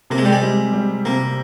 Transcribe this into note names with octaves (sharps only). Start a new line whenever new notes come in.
C3 A#3
G#3
G3
G#3
G3
G3
C3 A#3